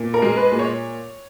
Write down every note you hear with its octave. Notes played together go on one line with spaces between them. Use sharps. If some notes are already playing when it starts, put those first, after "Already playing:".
Already playing: A#2
A#4
G#3
B4
A#2
C#5